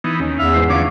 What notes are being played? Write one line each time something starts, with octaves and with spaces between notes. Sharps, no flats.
E3 B3 D#4
D#2 C#4 D#4
E2 E5 F5
G#2 E3 C5
D3 E3 C#4 D4 F4 B4 D6